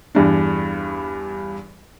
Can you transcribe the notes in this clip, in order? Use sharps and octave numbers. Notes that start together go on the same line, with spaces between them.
E2 G2 D4